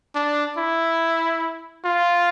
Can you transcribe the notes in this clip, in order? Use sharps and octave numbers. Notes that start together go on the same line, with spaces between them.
D4
E4
F4